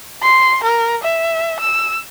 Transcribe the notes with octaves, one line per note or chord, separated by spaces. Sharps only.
C6
A#4
E5
E6